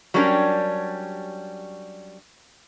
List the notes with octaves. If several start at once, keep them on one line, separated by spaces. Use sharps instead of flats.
F#3 G3 C#4 D4 G4 A#4